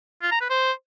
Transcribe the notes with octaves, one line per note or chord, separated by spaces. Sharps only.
F4
A#5
B4
C5